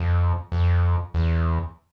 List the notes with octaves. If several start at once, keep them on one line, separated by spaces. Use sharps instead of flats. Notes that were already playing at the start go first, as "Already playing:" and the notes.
Already playing: F2
F2
E2